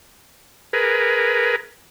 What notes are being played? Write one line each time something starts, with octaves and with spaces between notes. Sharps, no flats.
G#4 A#4 B4